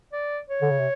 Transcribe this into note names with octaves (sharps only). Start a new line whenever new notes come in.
D5
C#5
D3
C#3
C3